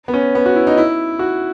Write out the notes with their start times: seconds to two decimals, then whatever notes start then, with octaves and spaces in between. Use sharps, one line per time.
0.08 B3
0.14 C#4
0.35 B3
0.46 F#4
0.56 E4
0.67 D#4
0.77 E4
1.19 F#4